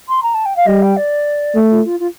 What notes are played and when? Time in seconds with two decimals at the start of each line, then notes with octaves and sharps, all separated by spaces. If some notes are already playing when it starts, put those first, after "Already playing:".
0.08 C6
0.23 A#5
0.34 A5
0.45 G5
0.56 F5
0.66 G3 D#5
0.82 G5
0.97 D5
1.55 A3
1.70 F4
1.85 F4
1.99 F4